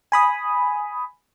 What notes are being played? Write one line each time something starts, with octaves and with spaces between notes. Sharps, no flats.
G#5 B5 D#6